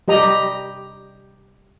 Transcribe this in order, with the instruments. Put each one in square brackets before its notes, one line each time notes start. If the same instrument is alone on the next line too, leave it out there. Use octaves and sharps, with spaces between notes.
[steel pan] G3 G4 D#5 A#5